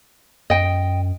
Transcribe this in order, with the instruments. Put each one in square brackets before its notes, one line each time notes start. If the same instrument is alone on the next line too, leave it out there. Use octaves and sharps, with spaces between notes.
[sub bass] F#2 [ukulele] D#5 G5